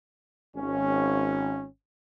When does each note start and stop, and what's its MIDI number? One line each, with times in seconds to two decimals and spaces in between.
0.55 1.65 32
0.55 1.65 61